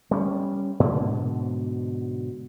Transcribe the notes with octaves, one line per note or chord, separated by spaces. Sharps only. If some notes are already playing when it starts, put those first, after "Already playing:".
G3 C#4
G#2 B2 D3